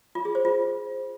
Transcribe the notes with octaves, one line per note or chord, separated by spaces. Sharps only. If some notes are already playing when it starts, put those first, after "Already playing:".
F4
G#4
C5
F4